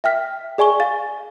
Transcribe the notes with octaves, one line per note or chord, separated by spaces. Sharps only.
E5 G5 F6 B6
G#4 D5 G#5 C#6 G7
F5 A6